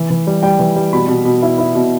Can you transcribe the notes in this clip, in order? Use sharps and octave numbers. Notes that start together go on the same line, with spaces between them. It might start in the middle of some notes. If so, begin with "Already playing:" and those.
Already playing: E3
E3
G3
G3 G5
E3
G3
B2 B5
B2
B2
E4
E4
B2